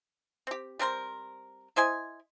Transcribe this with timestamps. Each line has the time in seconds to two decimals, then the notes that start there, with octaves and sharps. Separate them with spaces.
0.47 C4 G4
0.79 G3 C4 A#4 C5
1.76 E4 C5 D#5 G#5